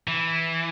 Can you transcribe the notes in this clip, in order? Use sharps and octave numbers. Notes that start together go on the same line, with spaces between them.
E3